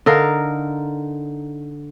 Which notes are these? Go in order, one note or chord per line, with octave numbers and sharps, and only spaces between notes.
D3 D#4 A#4 F5